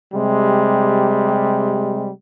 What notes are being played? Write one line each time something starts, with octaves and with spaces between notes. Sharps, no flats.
C3 G3 G#3